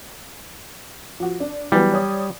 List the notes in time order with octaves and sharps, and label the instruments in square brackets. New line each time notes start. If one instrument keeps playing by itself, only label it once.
[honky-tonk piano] F3 F#4
D4
[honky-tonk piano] E3 F#3 B3 [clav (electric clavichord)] G3
[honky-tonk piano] C#5 D5 D#6